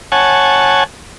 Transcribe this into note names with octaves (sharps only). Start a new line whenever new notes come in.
C#5 F#5 G#5 A5